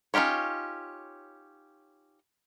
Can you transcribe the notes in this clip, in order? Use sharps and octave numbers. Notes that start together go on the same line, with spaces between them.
C#4 D#4 F4 G4 C#5